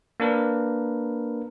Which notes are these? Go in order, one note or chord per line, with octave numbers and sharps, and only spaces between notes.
A#3 D4 A#4 B4